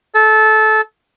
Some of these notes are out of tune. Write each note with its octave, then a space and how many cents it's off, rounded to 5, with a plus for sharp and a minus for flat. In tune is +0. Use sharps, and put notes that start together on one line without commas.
A4 -20